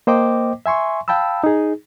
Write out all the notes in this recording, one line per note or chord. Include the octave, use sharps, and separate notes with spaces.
A#3 C5 D#5 G5 D6
E5 G#5 C6 C#6
F5 G5 A5 B5 E6
D#4 G#4